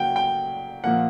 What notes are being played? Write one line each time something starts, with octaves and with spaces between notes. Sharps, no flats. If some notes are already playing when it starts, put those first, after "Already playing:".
Already playing: C#3 F#3 A#3 F#5 G5
G5
A#2 F3 A#3 F#5